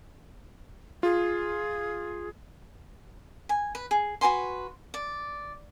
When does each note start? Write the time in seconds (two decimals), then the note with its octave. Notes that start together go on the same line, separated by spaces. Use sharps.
1.03 F4 G#4
3.49 G#5
3.75 B4
3.91 G#4
4.21 F#4 B4 G#5 C6
4.94 D5